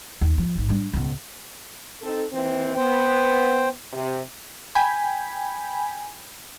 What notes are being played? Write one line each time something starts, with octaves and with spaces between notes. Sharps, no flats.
D#2
F3
A1 G#2
G3 D4
C#2 B2
C4 D#4 A4
D#2 E3 C4
B3 C5 G5
C3
G5 G#5 B5